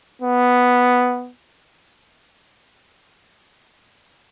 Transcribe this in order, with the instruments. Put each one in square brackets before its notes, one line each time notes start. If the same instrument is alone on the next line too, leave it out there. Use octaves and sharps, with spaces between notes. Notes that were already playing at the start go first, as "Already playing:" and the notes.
[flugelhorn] B3